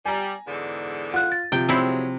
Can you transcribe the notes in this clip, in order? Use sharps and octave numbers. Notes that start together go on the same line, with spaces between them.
G3 G#5 A#5
E2 G#2 D3
F4 F#5 F#6
A6
C3 F3 G5
F#3 G#3 C4 E4